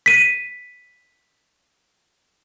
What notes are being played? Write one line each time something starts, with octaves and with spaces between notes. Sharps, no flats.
B6 D#7